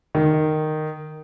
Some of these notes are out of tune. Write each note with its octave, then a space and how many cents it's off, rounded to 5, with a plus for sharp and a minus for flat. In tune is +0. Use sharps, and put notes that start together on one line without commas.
D#3 -10